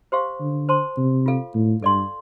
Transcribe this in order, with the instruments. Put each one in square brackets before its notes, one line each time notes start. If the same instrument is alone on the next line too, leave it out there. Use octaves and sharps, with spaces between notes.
[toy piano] G4 C5 F5 C6
[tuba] D3
[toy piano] C5 A5 C6
[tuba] C3
[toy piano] F4 A4 F5
[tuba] A2
[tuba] G2 [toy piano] A4 D5 F5 C6